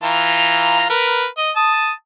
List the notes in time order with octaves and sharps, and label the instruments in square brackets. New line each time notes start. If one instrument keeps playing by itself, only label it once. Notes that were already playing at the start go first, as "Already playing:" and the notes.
[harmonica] E3 F4 A#5
A#4 B4
D#5
A5 D#6